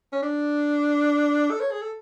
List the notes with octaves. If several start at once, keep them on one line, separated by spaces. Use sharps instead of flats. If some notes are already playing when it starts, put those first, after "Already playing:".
C#4
D4
A4
C#5
G#4
A4